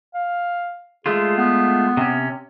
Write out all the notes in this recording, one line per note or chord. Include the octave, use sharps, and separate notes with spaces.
F5
G#3 A3 F4 G#4
B3
C3 C#4